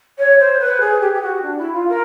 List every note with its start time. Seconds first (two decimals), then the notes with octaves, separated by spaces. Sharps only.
0.19 C#5
0.39 C5
0.60 B4
0.80 G#4
1.01 G4
1.14 G4
1.22 F#4
1.42 D4
1.58 E4
1.73 F4
1.89 A#4